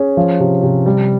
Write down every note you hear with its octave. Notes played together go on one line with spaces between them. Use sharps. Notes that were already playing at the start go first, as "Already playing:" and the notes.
Already playing: C#4 G#4
F3
C3
C3
G3